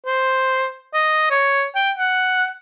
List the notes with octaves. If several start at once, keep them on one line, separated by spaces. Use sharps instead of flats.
C5
D#5
C#5
G5
F#5